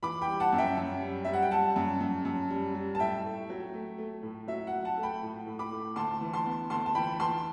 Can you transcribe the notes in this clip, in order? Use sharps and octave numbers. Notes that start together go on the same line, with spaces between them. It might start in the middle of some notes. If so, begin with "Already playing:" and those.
E3 B5 D6
G5 B5
G3
F#5 A5
F#2
E5 G5
F#2
G3
G3 E5
F#5
G5
G3 F#5 A5
F#2
F#2
F#2
G3
G3
A5
A2 E5 G5
A3
F#3
A3
A3
A2
F#3 E5
F#5
F#3
F#5 A5
A3
G5 B5
A2
A2
B5 D6
A3
D2 A5 C6
E3
A5 C6
B3
D2 A5 C6
A5
E3 G5 B5
E3 A5 C6